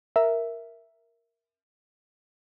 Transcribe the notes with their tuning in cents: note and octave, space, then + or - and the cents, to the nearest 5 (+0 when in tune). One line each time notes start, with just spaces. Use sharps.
A#4 +0 E5 +0